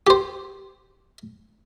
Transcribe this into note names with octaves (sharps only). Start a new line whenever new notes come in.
G4 C5